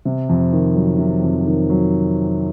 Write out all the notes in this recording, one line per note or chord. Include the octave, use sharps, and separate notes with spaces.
C3
F2
D#3
F#3
C3
F2
D#3
F#3